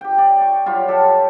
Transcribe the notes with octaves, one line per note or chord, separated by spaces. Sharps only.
G4 G5
D5
C#6
F#3 G3 F4
G4 A4 F#5